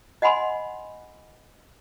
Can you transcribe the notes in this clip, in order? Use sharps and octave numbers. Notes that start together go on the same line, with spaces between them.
D#5 F#5 G#5 B5 C6